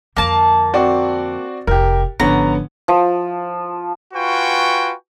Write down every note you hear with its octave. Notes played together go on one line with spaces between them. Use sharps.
F2 D3 A#3 A5
C4 F#4 D5
F1 G4 A#4
G#1 D3 F3 B3 C#4 A#5
F3
F4 F#4 B4 G5 G#5 C#6